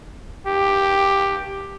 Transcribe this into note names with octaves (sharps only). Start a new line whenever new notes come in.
G4